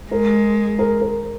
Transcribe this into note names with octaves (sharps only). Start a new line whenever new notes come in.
G#3 A#4
A#4
A#4